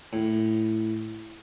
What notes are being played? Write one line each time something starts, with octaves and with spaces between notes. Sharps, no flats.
A2